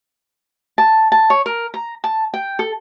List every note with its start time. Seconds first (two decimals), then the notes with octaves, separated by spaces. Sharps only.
0.78 A5
1.12 A5
1.30 C#5
1.46 A#4
1.74 A#5
2.04 A5
2.34 G5
2.59 A4